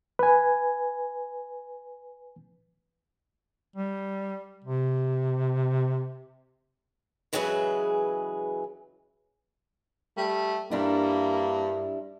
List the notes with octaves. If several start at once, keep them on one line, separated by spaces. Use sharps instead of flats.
B4 G#5
G3
C3
C#3 E3 F#3 G#3 G#4 B4
G3 A3
G2 G3 A#3 D4 E4